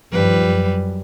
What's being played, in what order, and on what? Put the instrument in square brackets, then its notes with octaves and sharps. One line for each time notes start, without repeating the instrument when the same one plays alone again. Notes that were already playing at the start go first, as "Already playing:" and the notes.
[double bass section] G2 D#3 F3 [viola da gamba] G3 B4
[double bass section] F#2